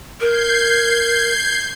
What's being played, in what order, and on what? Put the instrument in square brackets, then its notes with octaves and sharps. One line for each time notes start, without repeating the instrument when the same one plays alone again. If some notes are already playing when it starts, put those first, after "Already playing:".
[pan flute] A#4 [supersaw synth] G6 G#6 C7